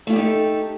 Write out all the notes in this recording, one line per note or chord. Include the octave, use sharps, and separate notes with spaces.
A3 D#4 F4 G4 A4